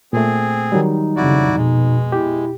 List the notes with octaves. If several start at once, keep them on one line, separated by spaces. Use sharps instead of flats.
A#2 A3 C4 G#4
D#3 F#3 G3 D#4
F2 C#3 E4 F#4 D5
B2 G#3
E4 G4